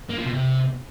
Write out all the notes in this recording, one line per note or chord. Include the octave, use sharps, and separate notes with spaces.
A#3
F3
B2
C3